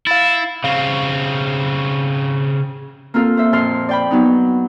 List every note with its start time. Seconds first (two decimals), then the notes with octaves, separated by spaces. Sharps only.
0.07 E4 F5 A6
0.64 C#3 C4 F5 C#6
3.14 A#3 C4 F4 A4 A#4 F5
3.37 C5 E5
3.52 F2 A#2 A5 C6 F6
3.89 D5 G5 B5
4.11 F#3 B3 D#4